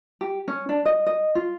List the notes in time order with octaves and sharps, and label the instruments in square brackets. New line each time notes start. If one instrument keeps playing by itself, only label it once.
[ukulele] G4
C#4
D4
D#5
D#5
F4